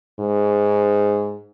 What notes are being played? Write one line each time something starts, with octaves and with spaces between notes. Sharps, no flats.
G#2